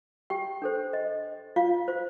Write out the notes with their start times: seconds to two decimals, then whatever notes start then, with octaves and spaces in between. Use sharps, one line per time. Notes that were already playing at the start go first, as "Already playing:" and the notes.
0.30 G4 G5
0.62 D4 A4 C5
0.93 D#5
1.56 F4 F5
1.88 F4 C5